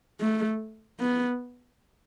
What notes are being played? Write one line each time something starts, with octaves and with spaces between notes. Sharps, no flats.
A3
B3